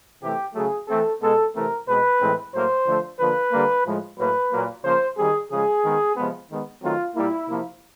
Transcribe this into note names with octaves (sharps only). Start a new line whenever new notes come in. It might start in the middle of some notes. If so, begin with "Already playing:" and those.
C3 E3 A3 C4 G4
C#3 F#3 A3 G#4
E3 A3 C4 A4
B2 G#3 B3 A4
C3 E3 A3 C4 A#4
B2 G#3 C4 B4
A2 E3 G#3 C4
A2 F#3 A#3 C5
D3 F3 A3
D3 F3 A#3 B4
D3 G3 A#3
A2 F3 G#3
A2 F#3 A#3 B4
A#2 F#3 A#3
C#3 F3 A#3 C5
D#3 G3 C4 G#4
C#3 F3 G#3 G#4
D#3 G#3 B3
C3 F3 G#3 B3
D#3 G#3 B3
D#3 F#3 A3 C4 F4
A#2 G3 A#3 E4
C3 F3 A#3